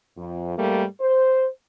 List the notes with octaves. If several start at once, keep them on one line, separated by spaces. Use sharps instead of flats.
F2
G#2 G3 A3 A#3
C5